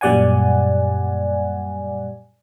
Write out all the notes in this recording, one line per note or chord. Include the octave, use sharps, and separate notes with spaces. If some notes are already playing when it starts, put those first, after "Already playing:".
F#2 A#2 G3 D5 F#5 G#5